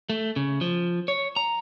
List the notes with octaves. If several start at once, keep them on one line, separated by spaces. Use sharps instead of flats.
A3
C#3
F3
C#5
A#5